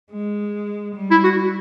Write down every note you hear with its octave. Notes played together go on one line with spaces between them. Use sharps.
G#3
G3
E4
F#4